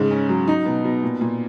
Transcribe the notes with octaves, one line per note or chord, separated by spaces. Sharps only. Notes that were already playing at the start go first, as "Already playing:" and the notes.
Already playing: G#2 C#3
C#4
F#3
D#4
B2
B2
A#2
A#2